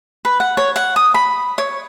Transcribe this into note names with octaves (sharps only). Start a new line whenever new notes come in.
B4
F#5
C#5
F#5
D#6
B5
C#5